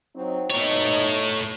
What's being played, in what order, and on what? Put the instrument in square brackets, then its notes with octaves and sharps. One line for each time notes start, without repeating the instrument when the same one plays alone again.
[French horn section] F#3 C4 D#4
[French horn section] B2 D#4 [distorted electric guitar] A3 C#5